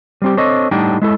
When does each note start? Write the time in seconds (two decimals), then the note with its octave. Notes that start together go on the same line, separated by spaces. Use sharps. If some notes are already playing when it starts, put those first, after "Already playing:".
0.22 G3 C4 G4
0.37 C4 D4 A4 C#5 D#5
0.71 A2 G3 D4 D#4 F#5 G5
1.02 G#3 E4 A4